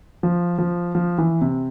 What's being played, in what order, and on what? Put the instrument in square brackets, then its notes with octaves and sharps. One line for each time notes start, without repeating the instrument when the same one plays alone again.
[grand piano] F3
F3
F3
E3
C3